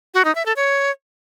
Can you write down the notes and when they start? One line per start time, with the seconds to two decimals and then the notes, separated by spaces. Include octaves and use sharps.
0.14 F#4
0.25 D#4
0.35 E5
0.46 A4
0.56 C#5